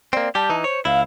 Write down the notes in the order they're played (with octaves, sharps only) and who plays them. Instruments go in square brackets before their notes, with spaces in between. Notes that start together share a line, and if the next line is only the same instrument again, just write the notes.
[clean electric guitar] A#3 C4 [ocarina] D5
[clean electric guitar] G3 G4 [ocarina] A5
[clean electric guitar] E3 D#4
[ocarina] C5 [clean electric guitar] C#5
[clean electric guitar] C#2 E4 [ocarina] F5